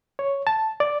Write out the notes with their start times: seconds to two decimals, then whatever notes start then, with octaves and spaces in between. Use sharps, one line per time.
0.19 C#5
0.47 A5
0.80 D5